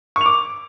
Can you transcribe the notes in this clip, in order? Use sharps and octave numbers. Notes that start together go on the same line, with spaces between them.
C#6 D6 F7